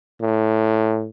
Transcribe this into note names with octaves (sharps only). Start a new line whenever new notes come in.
A2